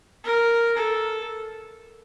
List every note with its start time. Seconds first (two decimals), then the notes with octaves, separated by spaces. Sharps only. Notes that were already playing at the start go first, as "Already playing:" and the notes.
0.24 A#4
0.77 A4